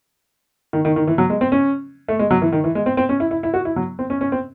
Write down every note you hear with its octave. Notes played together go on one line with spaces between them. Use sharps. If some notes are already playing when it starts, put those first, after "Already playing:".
D#3
D#3
D#3
E3
F#3
G#3
C4
C#4
A3
G#3
F#3
E3
D#3
E3
G#3
C4
C4
C#4
E4
E4
E4
F#4
E4
F#3
C4
C#4
C#4
C4